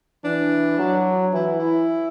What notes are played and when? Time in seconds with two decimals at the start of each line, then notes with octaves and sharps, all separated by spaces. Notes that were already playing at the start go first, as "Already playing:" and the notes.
0.24 E3 D4
0.79 F#3
1.33 E3 E4
1.58 E4